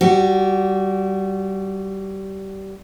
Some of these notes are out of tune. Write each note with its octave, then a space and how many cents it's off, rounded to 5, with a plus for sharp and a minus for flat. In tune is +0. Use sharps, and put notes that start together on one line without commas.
G3 -20 F#4 +0